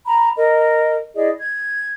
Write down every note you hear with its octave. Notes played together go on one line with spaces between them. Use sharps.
A#5 B5
A#4 D#5
E4 G#4 D5 D#5
G#6